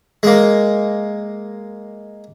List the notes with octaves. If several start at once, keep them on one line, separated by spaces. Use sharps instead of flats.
G#3 A#3